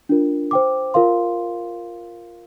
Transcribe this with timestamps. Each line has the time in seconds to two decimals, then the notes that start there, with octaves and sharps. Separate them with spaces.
0.09 D4 F4 A#4
0.51 C5 G5 D6
0.94 F4 A#4 F5 C6